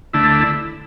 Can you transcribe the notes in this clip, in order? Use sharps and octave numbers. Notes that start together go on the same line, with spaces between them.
D2 D3 A3 E4